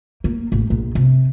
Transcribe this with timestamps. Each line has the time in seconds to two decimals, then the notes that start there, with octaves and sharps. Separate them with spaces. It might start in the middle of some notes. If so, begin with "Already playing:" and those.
0.24 A#3
0.52 A1
0.70 A#1
0.95 C3